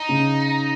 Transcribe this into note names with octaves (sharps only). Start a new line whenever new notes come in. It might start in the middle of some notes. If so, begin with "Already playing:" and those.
Already playing: D#4
C#3